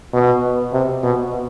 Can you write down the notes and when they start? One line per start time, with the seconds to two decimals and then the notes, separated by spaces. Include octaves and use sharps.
0.13 B2
0.73 C3
1.03 B2